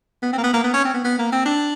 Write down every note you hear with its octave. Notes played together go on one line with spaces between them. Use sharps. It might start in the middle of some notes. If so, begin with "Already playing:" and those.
B3
C4
A#3
B3
A#3
B3
C#4
C4
B3
B3
A#3
C4
D4